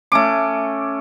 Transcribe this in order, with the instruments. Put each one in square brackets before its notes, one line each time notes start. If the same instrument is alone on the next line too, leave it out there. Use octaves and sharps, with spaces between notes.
[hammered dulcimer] A3 C#4 D6